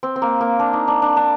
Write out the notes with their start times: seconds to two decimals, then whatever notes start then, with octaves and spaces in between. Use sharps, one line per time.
0.03 C4
0.16 C4
0.22 A#3
0.41 A#3
0.59 D4
0.73 D#4
0.88 D4
1.02 D4
1.16 D4